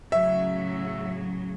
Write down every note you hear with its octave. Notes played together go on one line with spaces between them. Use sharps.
A2 C#3 F#3 E5